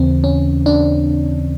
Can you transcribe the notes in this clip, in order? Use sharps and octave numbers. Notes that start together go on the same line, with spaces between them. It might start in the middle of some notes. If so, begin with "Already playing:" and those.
Already playing: D#2 C#3 E3 C4
C#4
D4